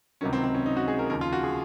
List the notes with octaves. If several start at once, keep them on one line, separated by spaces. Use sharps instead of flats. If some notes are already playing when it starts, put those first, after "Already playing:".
C#2 C3 D#3 F#3 C#4
C4
C4
C#4
D#4
F#4
G#4
A#4
D#2 C#3 F3 A#4
F4
F#4
G#4